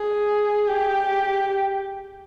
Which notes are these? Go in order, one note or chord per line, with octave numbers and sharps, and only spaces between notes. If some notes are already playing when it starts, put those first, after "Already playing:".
Already playing: G#4
G4